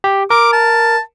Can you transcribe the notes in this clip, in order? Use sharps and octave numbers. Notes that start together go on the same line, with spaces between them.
G4
A#4 D6
A5